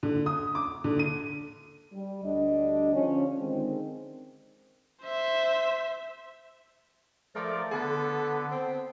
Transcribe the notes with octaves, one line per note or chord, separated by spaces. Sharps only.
D3
D#6
D6
D3
D#7
G3
D2 G3 D4 D#5
D3 F3 C#4
D3 D#3 G#3 C4
C5 E5
F3 A3 A#4 D5
D3 B3 A4
C4